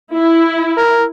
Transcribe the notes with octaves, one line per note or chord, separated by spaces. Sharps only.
E4
A#4